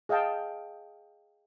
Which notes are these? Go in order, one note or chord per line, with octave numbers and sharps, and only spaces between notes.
G#4 D#5 F5 G5 A5